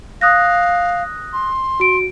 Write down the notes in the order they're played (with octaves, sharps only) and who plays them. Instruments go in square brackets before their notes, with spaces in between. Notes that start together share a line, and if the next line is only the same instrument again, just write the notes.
[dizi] F5 [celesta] D#6 F#6 A#6
[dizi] C6
[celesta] F#4 D7